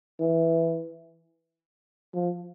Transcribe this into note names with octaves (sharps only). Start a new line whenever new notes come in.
E3
F3